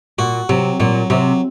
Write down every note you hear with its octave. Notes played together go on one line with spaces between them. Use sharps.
A#2 F#4
C3 F#3
A#2 F#3
C3 F#3